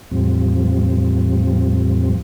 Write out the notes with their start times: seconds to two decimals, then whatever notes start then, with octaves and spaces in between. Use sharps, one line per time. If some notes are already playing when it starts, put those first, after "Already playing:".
0.11 E2 A2 F3 G3 C4